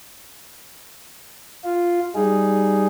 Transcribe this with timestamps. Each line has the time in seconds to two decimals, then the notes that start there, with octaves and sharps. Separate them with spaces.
1.64 F4
2.15 G3 D#4 G#4